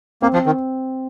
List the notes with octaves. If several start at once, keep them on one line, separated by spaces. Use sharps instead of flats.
A#3 C4
F3
D#3